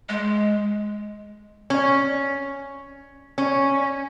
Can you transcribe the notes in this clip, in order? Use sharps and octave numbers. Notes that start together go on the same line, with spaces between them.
G#3
C#4
C#4